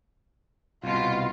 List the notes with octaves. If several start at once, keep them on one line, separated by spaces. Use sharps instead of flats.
C2 B2 F4